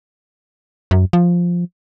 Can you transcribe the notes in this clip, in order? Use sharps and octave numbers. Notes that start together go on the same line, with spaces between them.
F#2
F3